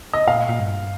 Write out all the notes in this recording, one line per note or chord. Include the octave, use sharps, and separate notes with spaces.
D#5
A#2 F5
A#2
G2